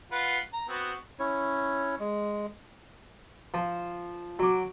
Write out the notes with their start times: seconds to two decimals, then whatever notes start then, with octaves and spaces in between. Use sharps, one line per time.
0.12 F4 B4 F#5
0.53 A#5
0.68 B3 C4 F#4
1.19 C#4 E4 C#5
1.99 G#3
3.54 F3
4.39 F#3 D6